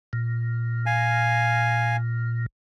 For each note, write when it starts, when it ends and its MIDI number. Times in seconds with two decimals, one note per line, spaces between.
0.13 2.46 46
0.86 1.97 77
0.86 1.97 80